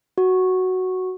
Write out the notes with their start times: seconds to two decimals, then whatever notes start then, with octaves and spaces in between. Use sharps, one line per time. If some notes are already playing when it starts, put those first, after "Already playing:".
0.18 F#4